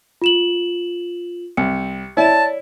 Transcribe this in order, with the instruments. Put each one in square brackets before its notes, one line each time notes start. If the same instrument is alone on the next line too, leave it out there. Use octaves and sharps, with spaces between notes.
[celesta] F4 E7 F#7
[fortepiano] C2 [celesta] C#7
[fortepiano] E4 [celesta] C#5 D5 [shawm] A5